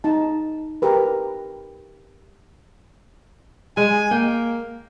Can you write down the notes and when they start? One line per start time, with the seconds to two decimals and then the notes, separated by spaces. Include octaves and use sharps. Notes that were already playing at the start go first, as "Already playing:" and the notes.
0.04 D#4 A5
0.82 G4 A#4 B4
3.77 G#3 G#5
4.11 A#3 G5